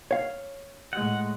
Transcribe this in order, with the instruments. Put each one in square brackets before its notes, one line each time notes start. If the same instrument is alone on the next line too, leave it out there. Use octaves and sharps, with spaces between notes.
[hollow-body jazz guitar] C#5 F5
[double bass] A2 G#3 [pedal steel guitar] F#5